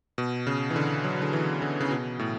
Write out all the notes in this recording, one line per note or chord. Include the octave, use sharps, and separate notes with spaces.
B2
C#3
E3
D3
F#3
D3
E3
D3
C#3
B2
A2